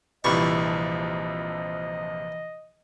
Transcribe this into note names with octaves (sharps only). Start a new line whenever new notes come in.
A#1 C3 E3 F3 G3 D#5 C#6